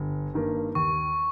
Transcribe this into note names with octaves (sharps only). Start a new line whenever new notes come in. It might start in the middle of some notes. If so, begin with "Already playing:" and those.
Already playing: G1
G2 D#3 A#3
D#2 C#6